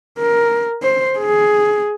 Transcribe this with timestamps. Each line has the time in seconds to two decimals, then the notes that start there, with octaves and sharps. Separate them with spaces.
0.19 A#4
0.83 C5
1.18 G#4